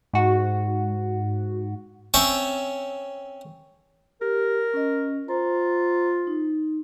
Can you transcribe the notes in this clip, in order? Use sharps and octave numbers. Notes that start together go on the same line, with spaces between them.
G#2 F#4
C4 C#4 C#5 E5 A5
G4 A#4
C#4 D#5
F4 C5 A#5
D#4